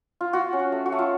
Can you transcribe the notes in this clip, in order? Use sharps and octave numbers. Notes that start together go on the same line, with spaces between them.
F4
F4 F#4
C#4
F#4
A3
F#4
A3
F4